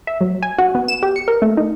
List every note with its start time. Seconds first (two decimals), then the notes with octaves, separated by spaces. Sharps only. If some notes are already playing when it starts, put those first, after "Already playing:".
0.07 E5
0.21 F#3
0.43 G#5
0.58 F#4
0.75 B3
0.88 E7
1.03 G4
1.16 C#7
1.28 A#4
1.42 A3
1.57 D#4